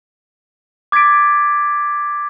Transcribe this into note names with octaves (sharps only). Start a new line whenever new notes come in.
D6 G#6 A6 B6 D7